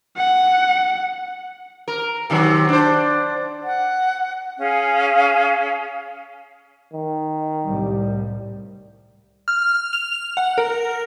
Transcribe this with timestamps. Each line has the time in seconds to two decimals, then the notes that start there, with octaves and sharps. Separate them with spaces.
0.17 F#5
1.88 A#4
2.30 C3 D#3 F#3
2.69 D4 C5
3.62 F#5
4.59 C#4 G#4 F5
6.93 D#3
7.67 C2 A2 G3
9.48 F6
9.93 F7
10.37 F#5
10.58 A#4